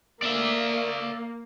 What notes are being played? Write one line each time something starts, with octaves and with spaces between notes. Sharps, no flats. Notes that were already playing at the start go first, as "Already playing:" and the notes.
A#3 D5 E5